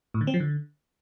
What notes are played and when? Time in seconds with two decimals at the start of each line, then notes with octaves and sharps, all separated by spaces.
0.14 A2
0.21 D3
0.27 C4
0.34 F3
0.40 D3